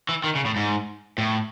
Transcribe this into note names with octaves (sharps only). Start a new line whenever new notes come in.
E3
D#3
C#3
A2
G#2
A2